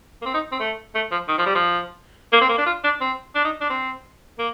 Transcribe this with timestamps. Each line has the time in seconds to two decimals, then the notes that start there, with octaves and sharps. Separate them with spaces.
0.22 A#3
0.25 C4
0.34 D#4
0.52 C4
0.60 A3
0.95 A3
1.12 F3
1.29 D#3
1.38 F3
1.46 G3
1.55 F3
2.33 A#3
2.41 C4
2.49 A#3
2.58 D4
2.66 F4
2.84 D4
3.01 C4
3.35 D4
3.44 D#4
3.61 D4
3.70 C4
4.39 A#3